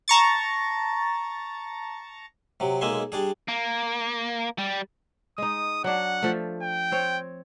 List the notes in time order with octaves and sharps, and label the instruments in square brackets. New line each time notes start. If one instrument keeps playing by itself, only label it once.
[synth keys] A5 A#5 C#6 A6
[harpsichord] C3 F#3
B1 G#3 A#3 E5 G#5 C6
G3 D4 G#4
[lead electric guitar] A#3
G3
[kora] G#3 D#4 [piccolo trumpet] D#6
[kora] F#3 D4 [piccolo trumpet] F#5
[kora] F3 A3
[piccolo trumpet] G5
[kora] C4 C5 C#5